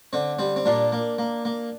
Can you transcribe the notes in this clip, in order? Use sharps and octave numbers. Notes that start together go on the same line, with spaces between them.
D3 C4
G3 C4
C4
A#2 A#3 D4
A#3
A#3
A#3